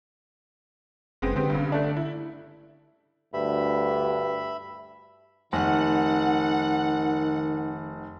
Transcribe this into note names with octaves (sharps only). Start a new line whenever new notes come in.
F#1 G#3 B3 C4
D3 B3 C4 G4
G2 C#3
A3 D4
E4
D2 G2 E5 B5
F1 D#3 F#5